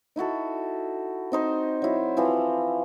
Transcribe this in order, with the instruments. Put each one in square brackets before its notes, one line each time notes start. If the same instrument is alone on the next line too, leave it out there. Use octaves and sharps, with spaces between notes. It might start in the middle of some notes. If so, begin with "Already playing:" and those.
[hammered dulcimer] D#4 E4 F#4 A4
C4 D#4 C5
F#3 E4
E3 F3 C4